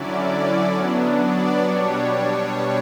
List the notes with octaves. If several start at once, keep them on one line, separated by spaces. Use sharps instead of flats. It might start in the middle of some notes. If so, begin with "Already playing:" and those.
Already playing: D3 F#3 C#4 E4 D5
D5
F#3 B3 D4
D5
B2 G3 D4 C#5